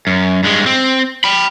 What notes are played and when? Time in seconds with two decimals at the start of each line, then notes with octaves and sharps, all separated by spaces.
0.07 F#2
0.43 G2 G#3
0.66 C4
1.24 G5 B5